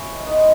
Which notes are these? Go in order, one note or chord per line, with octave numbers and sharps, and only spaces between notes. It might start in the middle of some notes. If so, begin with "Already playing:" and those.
Already playing: E3 C#4 E4
G#2
G#3 B3 D#4